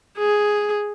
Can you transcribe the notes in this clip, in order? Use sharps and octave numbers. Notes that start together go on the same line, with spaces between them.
G#4